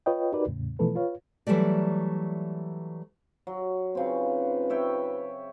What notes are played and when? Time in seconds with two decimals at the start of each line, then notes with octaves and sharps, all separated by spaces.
0.06 F4 B4 C#5 D#5 G5
0.32 D#4 F#4 G4 A#4 B4 D5
0.47 E2 A2 C#3
0.79 B2 E3 F3 A3 A4 B4
0.96 F4 B4 C#5 F5
1.47 E3 F#3 G3 A3 D5
3.47 F#3
3.95 C#3 C4 D#4 F4 B4
4.70 C#5 E5 G5